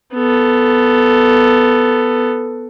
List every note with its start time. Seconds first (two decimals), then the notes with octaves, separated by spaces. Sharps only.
0.14 B3 A4